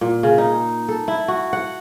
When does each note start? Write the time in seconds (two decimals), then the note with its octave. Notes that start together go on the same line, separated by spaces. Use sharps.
0.01 A#2
0.23 C#3
0.38 D#4
0.89 A4
1.08 E4
1.28 F#4
1.53 F#5